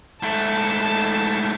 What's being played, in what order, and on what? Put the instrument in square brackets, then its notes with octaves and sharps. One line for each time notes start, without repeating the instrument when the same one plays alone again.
[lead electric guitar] G#2 A3 [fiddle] A5